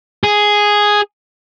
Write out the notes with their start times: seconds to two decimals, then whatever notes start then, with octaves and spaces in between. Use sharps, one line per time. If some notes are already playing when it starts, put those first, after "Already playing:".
0.24 G#4